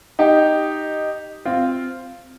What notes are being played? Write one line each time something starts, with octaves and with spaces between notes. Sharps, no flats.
D#4 G4
C4 F4